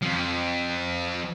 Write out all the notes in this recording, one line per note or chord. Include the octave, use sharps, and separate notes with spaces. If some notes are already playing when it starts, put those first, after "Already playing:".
F2 F3